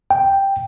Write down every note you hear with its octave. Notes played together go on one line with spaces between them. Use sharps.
G5